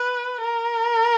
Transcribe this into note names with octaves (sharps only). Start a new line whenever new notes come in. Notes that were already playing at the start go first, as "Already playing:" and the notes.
Already playing: B4
A#4